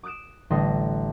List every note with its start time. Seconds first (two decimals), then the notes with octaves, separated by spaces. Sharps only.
0.03 D6 D#6 F#6 D7 E7
0.50 A1 D3 G3 C6 D#6 A#6